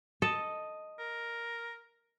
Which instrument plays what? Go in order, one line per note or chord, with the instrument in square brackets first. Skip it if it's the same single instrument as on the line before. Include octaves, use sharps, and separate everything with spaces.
[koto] A4 [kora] D#5
[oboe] A#4